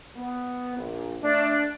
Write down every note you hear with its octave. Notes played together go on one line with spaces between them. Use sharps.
B3
A#1
A3 D4